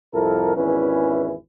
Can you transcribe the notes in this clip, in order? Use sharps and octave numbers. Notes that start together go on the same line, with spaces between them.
C2 F2 E4 A4 A#4
G#1 E2 E3 C#4 E4 B4